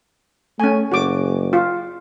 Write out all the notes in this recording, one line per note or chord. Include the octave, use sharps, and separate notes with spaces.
A3 C#4 G#5
F#1 F#4 D6
F4